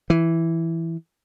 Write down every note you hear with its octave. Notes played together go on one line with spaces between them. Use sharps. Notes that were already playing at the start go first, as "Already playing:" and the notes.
E3